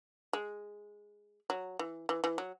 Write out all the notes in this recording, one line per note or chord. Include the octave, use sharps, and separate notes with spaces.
G#3
F#3
E3
E3
E3
F#3